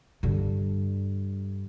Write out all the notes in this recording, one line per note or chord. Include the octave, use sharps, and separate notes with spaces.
G2 D3